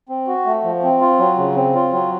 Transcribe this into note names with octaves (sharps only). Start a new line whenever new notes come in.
C4
F#4
A3
F3
C4
F4
F#3
C#3
C4
F4
F#3